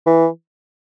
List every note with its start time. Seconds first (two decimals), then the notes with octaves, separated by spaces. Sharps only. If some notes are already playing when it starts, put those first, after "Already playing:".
0.06 E3